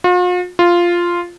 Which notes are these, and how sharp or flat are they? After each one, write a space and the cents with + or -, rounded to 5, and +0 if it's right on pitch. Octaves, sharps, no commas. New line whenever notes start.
F4 +45
F4 -5